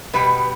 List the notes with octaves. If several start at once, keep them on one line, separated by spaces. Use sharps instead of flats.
B2 G3 B3 B4